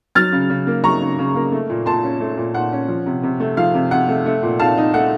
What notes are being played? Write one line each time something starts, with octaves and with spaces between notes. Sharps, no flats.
F#3 F6 A6
C#3
C#3
A#3
F#3 A#5 C#6
C#3
C#3
A#3
A3
A#2
A#2 A5 C6
C#4
A3
A#2
A#2 F#5
C#4
F3
C3
C3
A3
F3 F5
C3
C3 F#5
A3
A3
A#2
A#2 F5 A5
D#4
A3 F#5